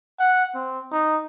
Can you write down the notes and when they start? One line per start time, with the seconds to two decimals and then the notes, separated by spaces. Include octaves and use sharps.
0.20 F#5
0.55 C4
0.92 D#4